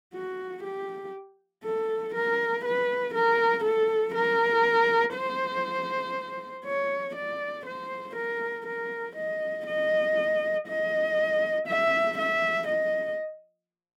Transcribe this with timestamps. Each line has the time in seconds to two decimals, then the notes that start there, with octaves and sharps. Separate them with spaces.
0.14 F#4
0.64 G4
1.64 A4
2.15 A#4
2.65 B4
3.15 A#4
3.64 A4
4.15 A#4
5.15 C5
6.66 C#5
7.16 D5
7.66 C5
8.16 A#4
8.67 A#4
9.16 D#5
9.67 D#5
10.68 D#5
11.68 E5
12.18 E5
12.68 D#5